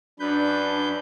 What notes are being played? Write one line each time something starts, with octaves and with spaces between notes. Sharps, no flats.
F#2 D4 B4 G6